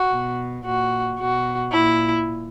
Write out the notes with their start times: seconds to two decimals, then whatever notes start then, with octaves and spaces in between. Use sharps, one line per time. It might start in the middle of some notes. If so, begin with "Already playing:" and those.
Already playing: F#4
0.10 B2
0.64 A#2 F#4
1.19 B2 F#4
1.73 A#2 E4